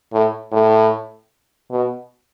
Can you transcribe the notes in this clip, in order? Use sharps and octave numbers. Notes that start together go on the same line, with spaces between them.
A2
A2
B2